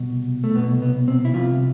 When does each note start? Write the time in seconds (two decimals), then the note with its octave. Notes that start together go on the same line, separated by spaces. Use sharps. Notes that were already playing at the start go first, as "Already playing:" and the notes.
Already playing: C2 B2
0.44 A3
0.55 C2 B2 B3
0.82 B3
1.08 C4
1.25 E4
1.34 C2 C3 F3 F4